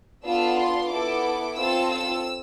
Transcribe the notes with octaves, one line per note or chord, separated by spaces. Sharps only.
B3 D4 F4 A4 E6
C6
B3 E4 A4 D6
C4 F4 A4 E6
E6